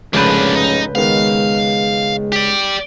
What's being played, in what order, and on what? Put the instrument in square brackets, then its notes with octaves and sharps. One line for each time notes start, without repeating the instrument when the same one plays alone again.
[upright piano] F1 G#2 G6 [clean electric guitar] C#2 B4 [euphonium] C#3 [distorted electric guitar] A#3 D4
[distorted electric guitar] D#4
[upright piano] D#3 B3 [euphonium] G#3 [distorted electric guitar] F5
[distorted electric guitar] G4 D5